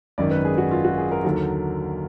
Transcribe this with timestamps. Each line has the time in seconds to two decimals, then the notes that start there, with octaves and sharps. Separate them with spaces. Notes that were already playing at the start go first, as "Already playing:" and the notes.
0.18 G#1 F#2 D#3 D5
0.31 B4
0.45 G#4
0.58 F#4
0.71 F4
0.84 F#4
0.98 G#4
1.11 A#4
1.25 D#2 D3 F#3 A#4